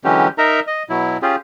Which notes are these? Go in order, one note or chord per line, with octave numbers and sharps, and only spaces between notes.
D3 E3 F#3 G#3 C#4 G4
D#4 A#4 E5 A#5
D#5
B2 F#3 E4
C#4 F4 G4 G#4